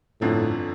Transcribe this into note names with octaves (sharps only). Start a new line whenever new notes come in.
G1 F2 A2 D3 F3